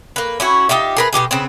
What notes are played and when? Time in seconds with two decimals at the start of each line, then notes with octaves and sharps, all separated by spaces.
0.16 A#3 B4
0.40 C#4 E4 F#4
0.69 D#4 F4 G4 E5
0.97 G#4 A#4 B4
1.13 B2 G3 G4 G#4
1.31 C#3 B3 C4